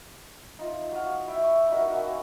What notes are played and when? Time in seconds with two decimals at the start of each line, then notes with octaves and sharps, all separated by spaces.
0.58 D#4 F4
0.91 F#3 F#4 F5
1.27 E4 E5 G5
1.44 C#6
1.69 D#4 E4 F#4 A#4
1.92 A#3 C#4 F#4